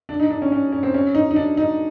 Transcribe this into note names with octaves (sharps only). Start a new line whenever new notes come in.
D4
D#4
D4
C#4
C#4
C#4
C4
C#4
D#4
D#4
D4
D#4